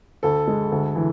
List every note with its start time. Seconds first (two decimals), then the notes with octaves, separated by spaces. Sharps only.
0.23 D2 A4
0.47 G#3
0.72 D2
0.96 E3